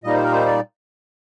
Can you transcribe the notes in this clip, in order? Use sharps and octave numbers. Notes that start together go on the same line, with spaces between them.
A#2 G3 A#3 D#4 D#5
C5
A#4
C5
D5